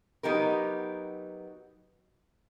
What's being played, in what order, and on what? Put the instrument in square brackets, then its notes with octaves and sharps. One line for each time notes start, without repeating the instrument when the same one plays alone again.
[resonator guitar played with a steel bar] F#3 B3 D#4 G4 A#4